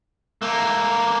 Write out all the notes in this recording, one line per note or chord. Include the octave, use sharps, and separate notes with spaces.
A3 A#3